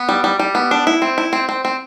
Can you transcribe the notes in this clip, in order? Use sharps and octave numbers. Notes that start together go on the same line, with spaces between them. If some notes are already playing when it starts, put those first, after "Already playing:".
Already playing: B3
G3
G3
G3
B3
D4
E4
C4
E4
C4
C4
C4